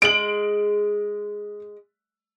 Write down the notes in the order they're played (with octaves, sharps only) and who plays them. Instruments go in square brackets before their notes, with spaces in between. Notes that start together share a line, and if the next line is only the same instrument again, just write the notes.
[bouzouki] G#3 [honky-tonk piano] D7 F#7